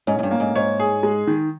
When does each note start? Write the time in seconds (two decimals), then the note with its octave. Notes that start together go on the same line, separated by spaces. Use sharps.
0.07 G#2 C#4
0.19 G#2
0.23 G2
0.31 A#3
0.40 G#2
0.55 G#2 C#5
0.80 G#4
1.03 G#3
1.27 D#3